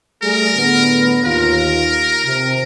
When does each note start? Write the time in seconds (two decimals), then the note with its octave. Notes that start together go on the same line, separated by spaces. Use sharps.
0.23 G3 A3 G#4 A#4
0.55 A2 D3 B3
1.25 D#2 F4 A#4
2.24 C3 A#4